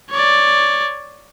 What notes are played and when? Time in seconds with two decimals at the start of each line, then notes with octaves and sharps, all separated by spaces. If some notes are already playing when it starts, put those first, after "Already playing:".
0.10 C#5 D5